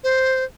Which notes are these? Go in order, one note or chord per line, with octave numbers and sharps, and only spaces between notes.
C5